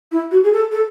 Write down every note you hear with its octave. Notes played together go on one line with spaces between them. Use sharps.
E4
F#4
G#4
A4
A4